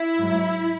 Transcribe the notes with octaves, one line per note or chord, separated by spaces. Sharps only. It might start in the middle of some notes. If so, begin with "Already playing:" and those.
Already playing: E4
G#2 F#3